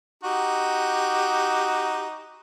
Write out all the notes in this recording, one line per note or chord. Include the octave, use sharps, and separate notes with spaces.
D#4 F#4 G4